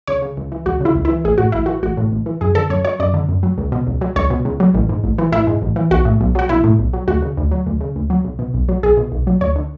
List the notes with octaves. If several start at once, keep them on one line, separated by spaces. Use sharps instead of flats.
C#2 C#5
C#3
C#2
E3
C#2 F#4
C#3 E4
C#2
E3 E4
A1 G#4
A2 F#4
A1 E4
E3 F#4
A1 F#4
A2
A1
E3
F#2 G#4
D3 A4
F#2 C#5
F#3 C#5
F#2 D5
D3
F#2
F#3
C#2
B2
C#2
F#3
C#2 C#5
B2
C#2
F#3
A1
G#2
A1
E3
A1 E4
G#2
A1
E3
B1 F#4
A2
B1
F#3 F#4
B1 E4
A2
B1
F#3
D2 F#4
C#3
D2
F#3
D2
C#3
D2
F#3
B1
B2
B1
F#3
B1 G#4
B2
B1
F#3
D2 C#5
D3